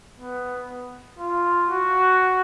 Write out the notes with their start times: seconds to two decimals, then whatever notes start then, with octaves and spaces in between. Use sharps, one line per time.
0.19 B3
1.19 F4
1.68 F#4